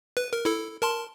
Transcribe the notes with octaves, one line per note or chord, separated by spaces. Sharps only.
B4
A#4
E4 A4
A#4 A5 C6